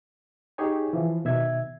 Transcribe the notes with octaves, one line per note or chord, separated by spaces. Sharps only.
D#4 G4 G#4 C#5 G#5
E3 F3
B2 D#3 E5 G#6